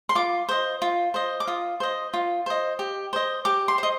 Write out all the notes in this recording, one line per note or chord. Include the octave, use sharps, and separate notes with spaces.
C6
F4 D6
C5 D#5
F4
C5 D#5
D6
F4 D#6
C5 D#5
F4
C5 D#5
G4
C5 D#5
G4 D6
C6
C5 D#5